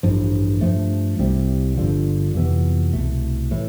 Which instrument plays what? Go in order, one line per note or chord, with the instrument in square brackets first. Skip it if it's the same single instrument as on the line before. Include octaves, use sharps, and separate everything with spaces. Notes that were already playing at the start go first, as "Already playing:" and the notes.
[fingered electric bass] A1 G2 F3
G2 F3 A3
C2 C3 G3
G1 G2 D3 F3
F2 C3 E3 B3
C2 B2 A3
A2 E3